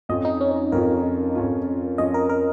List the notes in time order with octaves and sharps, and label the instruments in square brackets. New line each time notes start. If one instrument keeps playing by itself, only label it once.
[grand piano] F2 F3 C#4 F4 [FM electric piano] D#5
[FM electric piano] D#4
C#4
C#4
D#4
[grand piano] F2 F3 C#4 F4 [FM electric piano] A#4
[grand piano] F2 F3 C#4 F4
[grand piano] F2 F3 C#4 F4 [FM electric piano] D#5
[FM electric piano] A#4
A#4